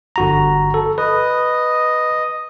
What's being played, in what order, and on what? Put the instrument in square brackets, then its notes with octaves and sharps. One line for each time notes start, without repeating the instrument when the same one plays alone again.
[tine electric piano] G1 F#4 A#5
A4
[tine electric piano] B4 [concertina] D#5